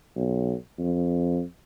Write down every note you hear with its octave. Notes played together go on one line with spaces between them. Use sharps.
B1
F2